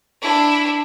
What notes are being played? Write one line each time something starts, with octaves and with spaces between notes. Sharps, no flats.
D4 E4